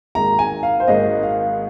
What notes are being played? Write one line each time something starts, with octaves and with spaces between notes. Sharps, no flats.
G#1 G#2 D#3 A#3 G#4 A#5
G#5
F5
C5
G#1 G#2 D#3 A#3 G#4 D#5
F5